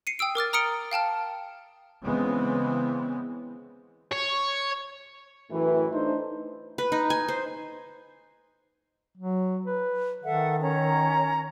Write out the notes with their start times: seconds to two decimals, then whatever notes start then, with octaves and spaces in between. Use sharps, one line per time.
0.07 C7 C#7 D#7
0.19 G5 D#6 E6 D7
0.35 A#4 D6 F6 A6
0.53 A#5 D#6 F6 C#7 D7 G7
0.91 F5 G5 A5 F6
2.03 C#3 E3 G#3 B3 C4
4.11 C#5
5.51 F#2 A2 E3
5.92 A3 D4 D#4 C5
6.78 B4
6.92 D#4
7.10 G#5
7.28 C5
9.18 F#3
9.66 B4
10.24 D#3 A4 E5 F#5
10.61 C#4 C#5 A#5